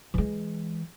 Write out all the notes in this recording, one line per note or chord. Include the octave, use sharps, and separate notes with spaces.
E3 G#3